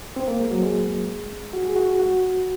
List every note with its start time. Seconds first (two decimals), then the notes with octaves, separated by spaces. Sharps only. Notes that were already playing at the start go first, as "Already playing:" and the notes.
0.16 C4
0.28 A#3
0.39 G#3
0.51 F#3
0.63 G#3
1.53 F#4
1.65 G#4
1.76 F#4
1.99 F#4